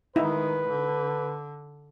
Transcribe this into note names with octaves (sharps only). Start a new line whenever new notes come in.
D#3 G#3 D#4 E4 B4
D3